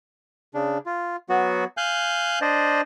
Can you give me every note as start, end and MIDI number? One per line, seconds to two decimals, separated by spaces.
0.54 0.78 49
0.54 0.78 62
0.86 1.16 65
1.29 1.64 54
1.29 1.64 59
1.29 1.64 66
1.77 2.39 77
1.77 2.39 80
1.77 2.39 90
1.77 2.39 91
2.41 2.81 62
2.41 2.81 72
2.41 2.81 74
2.41 2.81 75